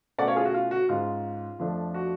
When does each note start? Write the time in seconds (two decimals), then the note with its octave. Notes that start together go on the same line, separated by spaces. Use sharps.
0.18 B2 A3 C#4 D5 F#5
0.28 C#5 F5
0.36 F4 G#4
0.45 F#4
0.54 F4
0.71 F#4
0.89 G#2 G#3 C#4 F4
1.59 F2 F3 A3 D4
1.94 F#4